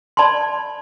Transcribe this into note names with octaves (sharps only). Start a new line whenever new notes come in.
D5 A5 B5 C6